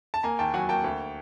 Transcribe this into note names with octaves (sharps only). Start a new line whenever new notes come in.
A5
A#3 G#5 A#5
D#2 G5 A5
F#3 F#5 G#5
A#3 G5 A5
D2